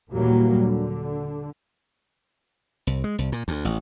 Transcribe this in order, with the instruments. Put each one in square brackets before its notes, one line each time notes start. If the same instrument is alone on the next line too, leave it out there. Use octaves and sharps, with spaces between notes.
[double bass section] D#2 A#2 E3 F#3 G3 A#3
D3
[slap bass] C2
G#3
C2
A#2
D2
A1